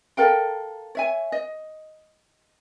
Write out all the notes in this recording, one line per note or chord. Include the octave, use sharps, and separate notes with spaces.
A4 A#4 F5 G5
C#5 E5 G#5
D#5